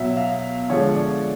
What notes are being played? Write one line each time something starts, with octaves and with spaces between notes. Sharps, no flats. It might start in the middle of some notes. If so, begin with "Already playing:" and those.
Already playing: B2 F#3 E5
F5
D3 F3 G#3 C#5
D5